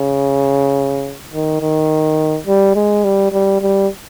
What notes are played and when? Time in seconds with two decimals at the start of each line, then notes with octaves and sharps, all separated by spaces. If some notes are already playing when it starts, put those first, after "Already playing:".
Already playing: C#3
1.33 D#3
1.61 D#3
2.47 G3
2.75 G#3
3.04 G3
3.32 G3
3.61 G3